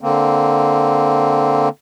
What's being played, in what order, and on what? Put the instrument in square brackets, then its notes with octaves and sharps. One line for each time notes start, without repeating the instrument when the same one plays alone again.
[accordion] D3 A#3 C4